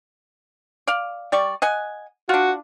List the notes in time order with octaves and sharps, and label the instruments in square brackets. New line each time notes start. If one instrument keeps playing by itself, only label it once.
[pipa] D5 F5
G3 D5 C#6
D#5 F#5 G#5
[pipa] D4 F4 [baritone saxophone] F#4